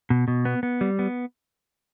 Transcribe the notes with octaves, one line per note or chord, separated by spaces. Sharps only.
B2
B2
B3
B3
G3
B3